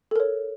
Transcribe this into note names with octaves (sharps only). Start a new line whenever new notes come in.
A4 A#4 C#5